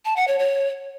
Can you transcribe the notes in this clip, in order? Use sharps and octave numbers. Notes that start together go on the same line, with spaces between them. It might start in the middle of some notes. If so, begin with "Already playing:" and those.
A5
F#5
C#5
C#5